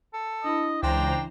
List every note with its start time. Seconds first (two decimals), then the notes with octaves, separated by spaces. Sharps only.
0.14 A4
0.44 D4 E4 D#5 B5
0.83 C#2 E3 D4 C5 G5 A#5